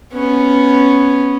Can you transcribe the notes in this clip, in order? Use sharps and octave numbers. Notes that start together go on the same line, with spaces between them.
B3 C#4